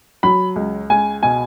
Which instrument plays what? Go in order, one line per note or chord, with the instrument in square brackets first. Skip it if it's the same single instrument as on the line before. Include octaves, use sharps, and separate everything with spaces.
[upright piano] F#3 B5
C#2
C#2 G#5
B2 G#5